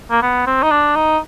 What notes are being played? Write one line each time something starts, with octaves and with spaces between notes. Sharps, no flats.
A#3
B3
C4
D#4
D4
D#4